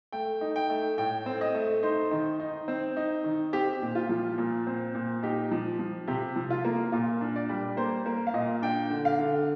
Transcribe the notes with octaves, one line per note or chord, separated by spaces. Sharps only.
A3 G5
D#4
G5
A3
A2 G5
C4
D#5
A3
D#4 C5
D#3
D#4
C4
D#4
D#3
C4 G4
A#2
F4
F3
A#2
C4
A#2
D#4 G4
F3
F3
C3 G4
F3
F4
A#3
A#2 F4
D4
D5
G3
A#3 C5
A#3
F5
A#2 D#5
D4 G5
D3
F5
D3